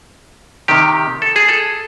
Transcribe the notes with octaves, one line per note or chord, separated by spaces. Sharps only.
C3 D#3 G4
A4
G#4
A4